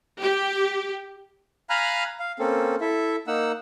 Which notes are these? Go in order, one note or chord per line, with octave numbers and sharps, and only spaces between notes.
G4
F5 G#5 A#5 B5 F6 F#6
F5
A#3 C4 C#4 A4
E4 A4 E5
A#3 D#4 F#5 E6